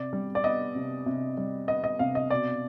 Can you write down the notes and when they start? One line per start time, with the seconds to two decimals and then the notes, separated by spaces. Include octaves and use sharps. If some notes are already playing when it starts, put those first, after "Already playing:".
Already playing: C3 D5
0.13 G3
0.35 D5
0.44 B3 D#5
0.75 C3
1.06 C3
1.37 G3
1.68 B3 D#5
1.84 D#5
1.99 C3 F5
2.15 D#5
2.30 B2 D5